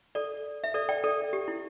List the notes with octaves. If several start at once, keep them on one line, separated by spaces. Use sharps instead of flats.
A4 D5
E5
A4 D5
D5 G5
A4 D5
G4
E4